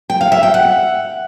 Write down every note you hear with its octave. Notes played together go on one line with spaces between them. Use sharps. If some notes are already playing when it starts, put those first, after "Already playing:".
G5
F5
E5
G5
F#5